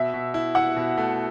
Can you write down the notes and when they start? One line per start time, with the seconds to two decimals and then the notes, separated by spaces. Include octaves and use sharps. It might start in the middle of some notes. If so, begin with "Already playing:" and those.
Already playing: B2 E5
0.14 B2
0.34 E4
0.55 E4 F#5
0.76 B2
0.98 A3